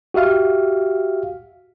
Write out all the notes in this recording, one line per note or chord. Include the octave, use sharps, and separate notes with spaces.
F#4 G4 E5 F5